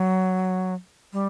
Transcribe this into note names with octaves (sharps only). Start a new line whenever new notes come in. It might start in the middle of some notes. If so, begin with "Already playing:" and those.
Already playing: F#3
G3